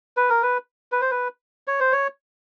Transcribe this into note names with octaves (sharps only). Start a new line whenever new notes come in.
B4
A#4
B4
B4
C5
B4
C#5
C5
C#5